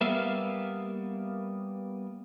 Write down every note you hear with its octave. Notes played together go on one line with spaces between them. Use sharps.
G3 A#3 B3 E5 F5